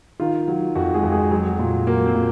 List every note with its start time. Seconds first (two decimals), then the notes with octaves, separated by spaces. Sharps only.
0.20 D#3 F4
0.48 F#3
0.75 F2 F#4
0.94 G#3 G#4
1.03 F2
1.12 G#3 G#4
1.31 F#3
1.59 A#2
1.87 F#3 A#3 A#4
2.06 C4 C5
2.14 A#2